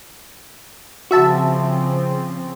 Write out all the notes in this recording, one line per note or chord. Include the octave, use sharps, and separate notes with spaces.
C#3 F3 C4 F#4 E5 A5